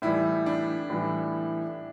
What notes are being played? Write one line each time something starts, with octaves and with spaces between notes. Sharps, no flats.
A2 E3 G3 E4
D4
A2 E3 G3